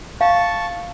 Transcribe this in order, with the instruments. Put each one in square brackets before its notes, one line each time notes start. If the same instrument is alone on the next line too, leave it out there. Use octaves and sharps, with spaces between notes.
[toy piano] F5 [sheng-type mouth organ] A5 C#6